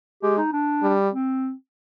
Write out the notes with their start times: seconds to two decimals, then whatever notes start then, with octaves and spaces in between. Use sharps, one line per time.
0.23 G#3 G4
0.38 D#4
0.53 D4
0.82 G3
1.11 C4